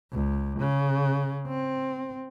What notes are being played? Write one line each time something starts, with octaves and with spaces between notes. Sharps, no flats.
C#2
C#3
C4